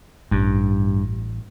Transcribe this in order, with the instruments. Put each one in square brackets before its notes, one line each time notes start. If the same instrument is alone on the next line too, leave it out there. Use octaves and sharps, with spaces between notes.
[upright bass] A1 [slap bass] G2